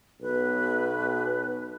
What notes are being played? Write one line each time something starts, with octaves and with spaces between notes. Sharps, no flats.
B1 B2 B4